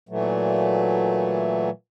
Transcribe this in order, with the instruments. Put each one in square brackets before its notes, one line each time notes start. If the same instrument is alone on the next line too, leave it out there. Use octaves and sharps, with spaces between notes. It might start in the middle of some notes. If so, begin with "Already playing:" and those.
[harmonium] A#2 E3 F#3 A3